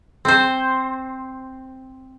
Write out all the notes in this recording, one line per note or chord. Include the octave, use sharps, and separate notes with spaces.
C4 C5